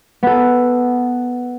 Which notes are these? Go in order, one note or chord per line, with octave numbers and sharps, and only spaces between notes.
B3 A4